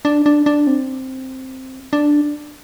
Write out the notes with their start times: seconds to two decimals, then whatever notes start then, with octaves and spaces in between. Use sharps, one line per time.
0.05 D4
0.26 D4
0.46 D4
0.67 C4
1.93 D4